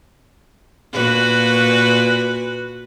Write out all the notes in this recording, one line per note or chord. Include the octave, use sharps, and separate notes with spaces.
A#2 F#4 B4